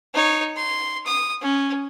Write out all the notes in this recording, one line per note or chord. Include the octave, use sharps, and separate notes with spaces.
D#4 C#5
C6
D#6
C#4